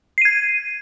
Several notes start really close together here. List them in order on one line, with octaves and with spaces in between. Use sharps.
C7 D#7 G#6